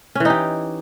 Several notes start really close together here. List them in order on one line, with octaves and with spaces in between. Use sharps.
C#4 E3 D#4 G4